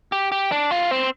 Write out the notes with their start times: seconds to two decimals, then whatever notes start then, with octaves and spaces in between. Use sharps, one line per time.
0.12 G4
0.32 G4
0.52 D4
0.71 F4
0.91 C4